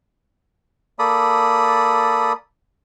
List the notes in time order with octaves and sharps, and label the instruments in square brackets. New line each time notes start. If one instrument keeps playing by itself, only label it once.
[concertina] A#3 A4 D5 B5 D#6